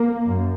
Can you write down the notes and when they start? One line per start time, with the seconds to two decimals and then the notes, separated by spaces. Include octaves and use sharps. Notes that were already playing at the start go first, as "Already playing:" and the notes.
Already playing: A#3
0.26 F#2